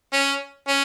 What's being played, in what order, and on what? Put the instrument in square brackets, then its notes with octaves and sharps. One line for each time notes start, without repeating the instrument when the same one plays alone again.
[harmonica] C#4
C#4